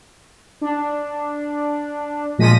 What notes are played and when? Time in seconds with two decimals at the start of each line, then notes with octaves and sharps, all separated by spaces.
0.61 D4
2.38 A#2 F3 G#3 A#6 B6 D#7